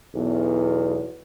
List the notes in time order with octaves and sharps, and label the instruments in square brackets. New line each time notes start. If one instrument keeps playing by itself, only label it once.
[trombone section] B1 E2